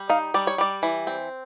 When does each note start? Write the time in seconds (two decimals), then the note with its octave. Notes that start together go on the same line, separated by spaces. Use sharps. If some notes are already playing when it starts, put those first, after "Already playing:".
Already playing: G3
0.09 D#4 F5
0.34 G3 D5
0.47 C#5
0.58 G3 D5
0.83 E3
1.07 C4